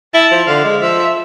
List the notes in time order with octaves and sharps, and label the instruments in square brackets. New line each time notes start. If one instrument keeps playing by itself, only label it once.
[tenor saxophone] E4 [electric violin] A5
[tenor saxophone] F3
[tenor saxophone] D3 [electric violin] F5
[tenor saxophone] G#3
[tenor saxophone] F3 [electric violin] E5